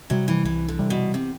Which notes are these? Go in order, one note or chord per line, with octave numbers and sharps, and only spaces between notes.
C3 F#3 G3
E3
C2 E3
D3
C3 G3
B2
C3